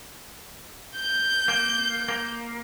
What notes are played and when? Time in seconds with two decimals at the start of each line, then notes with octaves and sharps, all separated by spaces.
0.96 G6
1.48 A#3
2.08 A#3